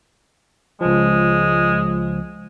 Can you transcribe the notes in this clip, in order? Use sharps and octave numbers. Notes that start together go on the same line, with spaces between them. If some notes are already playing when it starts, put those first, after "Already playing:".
C#2 F3 G#3